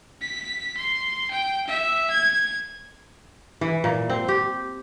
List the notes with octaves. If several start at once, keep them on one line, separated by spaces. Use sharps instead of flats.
B6
C6
G5
E5
G#6
E3
A#2
C4
G4